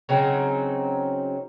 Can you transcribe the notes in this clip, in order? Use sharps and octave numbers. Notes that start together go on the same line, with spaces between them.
C#3 F#3 C4 D#4